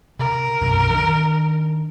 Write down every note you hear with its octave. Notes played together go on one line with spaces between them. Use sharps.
C3 A#4
B1 F#2 C3
D#3 D4